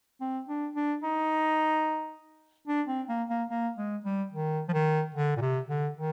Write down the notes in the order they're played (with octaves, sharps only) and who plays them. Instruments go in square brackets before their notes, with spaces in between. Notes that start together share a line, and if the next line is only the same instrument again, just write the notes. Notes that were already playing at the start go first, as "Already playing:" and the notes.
[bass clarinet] C4
D4
D4
D#4
D4
C4
A#3
A#3
A#3
G#3
G3
D#3
F3
D#3
D3
A#2
C3
D3
D#3